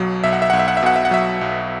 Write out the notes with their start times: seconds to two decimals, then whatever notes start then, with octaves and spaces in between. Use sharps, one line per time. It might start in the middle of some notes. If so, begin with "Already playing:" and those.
Already playing: B1 B2 F#3
0.24 B1 E5
0.33 F#5
0.42 E5
0.50 B1 F#5
0.59 E5
0.68 F#5
0.77 E5
0.83 B2 F#5
0.96 E5
1.05 F#5
1.11 F#3 E5
1.41 B1